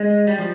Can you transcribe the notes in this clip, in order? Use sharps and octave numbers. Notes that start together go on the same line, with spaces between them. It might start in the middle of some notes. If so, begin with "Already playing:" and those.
Already playing: G#3
G3
F3